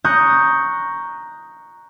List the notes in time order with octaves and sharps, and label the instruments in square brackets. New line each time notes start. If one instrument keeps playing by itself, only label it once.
[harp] A#5 C#6 D#6 F#6 G6 A#6